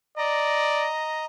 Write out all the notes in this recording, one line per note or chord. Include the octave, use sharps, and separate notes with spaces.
D5 D#5 A#5